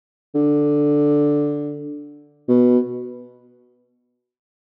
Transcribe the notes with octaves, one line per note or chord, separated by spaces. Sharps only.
D3
B2